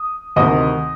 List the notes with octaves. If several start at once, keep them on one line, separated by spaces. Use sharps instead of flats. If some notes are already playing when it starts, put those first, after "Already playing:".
Already playing: D#6
D2 C3 D#3 D#5 D#6